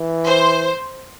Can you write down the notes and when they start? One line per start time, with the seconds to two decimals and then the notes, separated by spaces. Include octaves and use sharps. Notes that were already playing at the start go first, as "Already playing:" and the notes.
Already playing: E3
0.26 C5